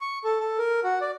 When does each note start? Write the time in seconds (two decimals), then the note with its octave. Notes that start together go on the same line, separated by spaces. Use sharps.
0.01 C#6
0.24 A4
0.40 A4
0.59 A#4
0.84 F#4
1.01 D5